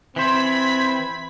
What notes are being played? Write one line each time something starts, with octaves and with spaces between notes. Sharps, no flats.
E3 C4 C5 B5 G#6 B6